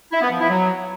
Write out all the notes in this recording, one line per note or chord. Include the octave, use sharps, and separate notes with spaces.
E4
B3
F3
E4
F#3